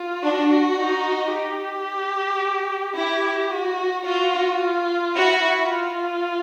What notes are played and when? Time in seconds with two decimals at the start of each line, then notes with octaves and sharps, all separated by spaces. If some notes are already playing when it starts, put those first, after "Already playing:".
Already playing: F4
0.23 D4 F#4
0.78 D#4
1.31 G4
2.95 E4 G4
3.50 F#4
4.05 F4 F#4
4.60 F4
5.15 E4 F#4
5.69 F4